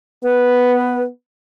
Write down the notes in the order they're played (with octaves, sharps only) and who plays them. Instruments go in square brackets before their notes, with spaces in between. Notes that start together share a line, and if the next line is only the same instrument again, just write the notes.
[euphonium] B3 [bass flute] B4